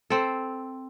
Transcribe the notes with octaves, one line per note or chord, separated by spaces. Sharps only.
C4 A4